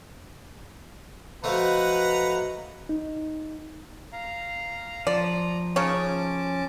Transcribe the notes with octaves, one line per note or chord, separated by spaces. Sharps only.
F3 A3 F#4 B4 D#5 F#5 A#5
D#4
F5 A#5
F3 D5 A#5
C#3 C#4 D#4 C#5 A5 D6